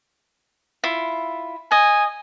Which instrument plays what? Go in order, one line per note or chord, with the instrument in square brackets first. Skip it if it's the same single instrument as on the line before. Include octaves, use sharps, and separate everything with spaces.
[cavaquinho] E4 F4
[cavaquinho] D#5 [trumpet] G#5